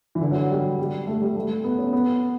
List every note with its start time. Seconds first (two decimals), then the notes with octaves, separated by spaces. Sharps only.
0.15 E3
0.21 D3
0.31 F#3
0.51 G3
0.79 G3
1.07 A3
1.22 G3
1.36 A3
1.64 B3
1.79 C#4
1.93 B3